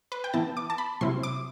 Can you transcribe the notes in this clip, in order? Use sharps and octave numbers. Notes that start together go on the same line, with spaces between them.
B4
G5
E3 B3 E4 A5
D6
A5
B5
C3 F#3 C4 E4 C6
D6